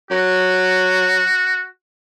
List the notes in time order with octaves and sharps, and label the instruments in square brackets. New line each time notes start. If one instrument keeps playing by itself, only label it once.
[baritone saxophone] F#3 [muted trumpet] F#4